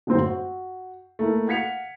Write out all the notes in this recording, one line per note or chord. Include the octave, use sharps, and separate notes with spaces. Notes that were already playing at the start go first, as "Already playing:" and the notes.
G1 F#2 A2 C4 C5
F#4
A3 A#3 E4
F5 F#5 G#6 B6 C#7 F7